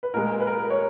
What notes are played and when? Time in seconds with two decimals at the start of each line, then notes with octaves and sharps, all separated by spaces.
0.03 B4
0.14 A#2 G#3 A#4
0.40 B4
0.47 A#4
0.70 C#5